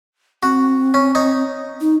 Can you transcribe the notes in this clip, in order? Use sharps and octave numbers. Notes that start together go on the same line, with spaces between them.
C4 F#4
C#4
D#4 C#5
D#4